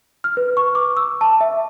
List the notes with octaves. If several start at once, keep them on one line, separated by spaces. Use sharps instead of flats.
F6
B4
C#6
D6
E6
A5
E5